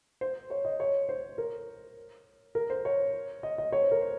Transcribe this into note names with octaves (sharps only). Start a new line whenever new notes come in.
C5
C#5
D#5
C#5
C5
A#4
A#4
C5
C#5
D#5
D#5
C#5
C5
A#4
C5